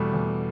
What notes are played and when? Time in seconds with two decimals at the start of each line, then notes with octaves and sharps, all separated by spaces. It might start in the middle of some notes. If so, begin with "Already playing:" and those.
Already playing: E2 B2 G3 A3
0.14 E2